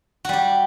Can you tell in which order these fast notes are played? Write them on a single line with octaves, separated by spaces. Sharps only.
F#4 G3 G4